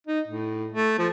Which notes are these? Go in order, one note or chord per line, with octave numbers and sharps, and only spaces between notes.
D#4
A2
A3
F3